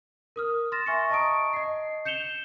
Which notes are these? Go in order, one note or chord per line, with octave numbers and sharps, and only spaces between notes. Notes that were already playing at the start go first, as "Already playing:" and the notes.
A#4 D#6 F6
C6 F6 A6 A#6 E7
E5 G#5 C#6 A6 A#6 C#7
D#5 A5 A#5 C#6 D#6 D7
D#5 C7
G6 C#7 E7 F7 G7